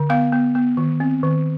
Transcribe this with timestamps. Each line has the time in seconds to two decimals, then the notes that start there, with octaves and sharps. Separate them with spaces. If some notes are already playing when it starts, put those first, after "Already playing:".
Already playing: D3
0.10 B3 F5
0.33 B3
0.55 B3
0.77 D#3
1.00 C4
1.23 D#3